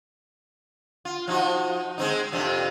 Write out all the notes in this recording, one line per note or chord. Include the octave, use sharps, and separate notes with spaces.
F4
F3 D#4 F#4
G#3 C4 D#4
F2 C3 D4